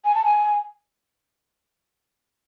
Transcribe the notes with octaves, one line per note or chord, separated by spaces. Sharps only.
G#5
A5
G#5